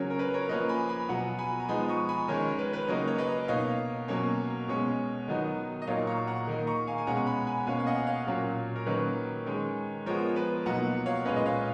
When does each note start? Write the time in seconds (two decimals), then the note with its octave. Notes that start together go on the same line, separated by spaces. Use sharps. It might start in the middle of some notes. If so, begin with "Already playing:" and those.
Already playing: C#3 F#3 C#4 A#4 C#5
0.10 A#4
0.19 B4
0.34 A#4 C#5
0.49 F3 A#3 C#4 B4 D#5
0.69 G#5 B5
0.89 G#5 B5
1.09 B2 F#3 B3 F#5 A#5
1.38 G#5 B5
1.60 A#5
1.68 F3 G#3 B3 D#4 G#5 B5
1.89 A#5 C#6
2.09 G#5 B5
2.28 D#3 G#3 C#4 A#4 C#5
2.44 A#4
2.59 B4
2.73 B4
2.88 C#3 F#3 A#3 D#4 A#4 C#5
3.07 C#5
3.18 B4 D#5
3.48 B2 A#3 D#4 C#5 F5
4.08 B2 F#3 A#3 C#4
4.68 B2 G#3 C#4
5.28 D#3 F#3 B3 D#4
5.82 D#5
5.87 A#2 F#3 A#3 D#4 C#5 F5
6.07 A#5 C#6
6.27 F#5 A#5
6.47 D#3 A#3 D#4
6.67 A#5 C#6
6.87 F5 G#5
6.98 G#5
7.07 B2 G#3 C#4 F#5 A#5
7.27 G#5 B5
7.47 G#5 B5
7.67 B2 A#3 C#4 F5 G#5
7.79 F5
7.87 D#5 F#5
8.07 C#5 F5
8.27 A#2 F#3 C#4
8.76 A#4
8.86 D#3 F#3 A#3 C#4 B4
9.46 D#3 G#3 C#4
10.06 F3 G#3 B3 A#4 C#5
10.36 B4
10.66 B2 F#3 A#3 D#4 F#5 A#5
11.06 C#5 F5
11.25 A#2 G#3 C#4 B4 D#5
11.36 D#5
11.46 C#5 F5